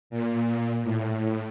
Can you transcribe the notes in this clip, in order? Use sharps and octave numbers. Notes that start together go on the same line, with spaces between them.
A#2
A2